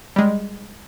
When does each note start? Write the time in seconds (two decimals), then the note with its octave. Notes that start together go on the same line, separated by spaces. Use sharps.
0.16 G3 G#3